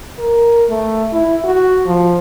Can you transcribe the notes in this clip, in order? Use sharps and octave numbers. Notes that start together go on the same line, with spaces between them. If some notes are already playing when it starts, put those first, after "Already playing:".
A#4
A3
E4
F#4
F3